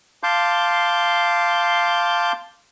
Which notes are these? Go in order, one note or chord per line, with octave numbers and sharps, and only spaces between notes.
F5 A5 C6 D6 G6